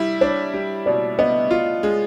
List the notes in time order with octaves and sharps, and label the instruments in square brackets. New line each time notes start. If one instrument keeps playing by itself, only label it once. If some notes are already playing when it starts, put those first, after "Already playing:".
Already playing: [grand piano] G3 E4
[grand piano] D4 [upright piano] C#5
[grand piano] G3
[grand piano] B2 [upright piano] D5
[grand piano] B3 [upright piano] D#5
[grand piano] F4
G#3